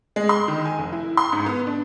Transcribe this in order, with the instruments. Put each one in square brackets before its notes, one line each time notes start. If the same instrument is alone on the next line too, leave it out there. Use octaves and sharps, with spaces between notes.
[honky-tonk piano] G#3
C6
D#3
G#5
F1
E4
C6
G#2
B3
D4